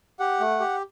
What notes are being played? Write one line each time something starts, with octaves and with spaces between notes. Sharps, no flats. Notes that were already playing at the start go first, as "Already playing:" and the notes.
G4 F#5
A3
G4